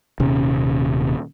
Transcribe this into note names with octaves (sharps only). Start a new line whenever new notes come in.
D#1 C3 C#4